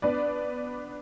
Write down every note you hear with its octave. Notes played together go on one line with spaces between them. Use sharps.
B3 D4 B4 D5